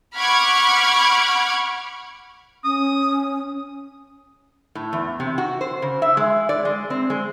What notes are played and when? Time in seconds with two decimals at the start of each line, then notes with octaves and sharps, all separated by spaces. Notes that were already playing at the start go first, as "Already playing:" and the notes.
0.16 F#5 B5 C#6 D6 F6 G#6
2.64 C#4 D#6
4.75 A2
4.93 E2
5.20 C3
5.38 F#4
5.61 C5
5.82 C#3
6.02 E5
6.17 G#3
6.49 D5
6.65 G#3
6.90 C4
7.10 G#3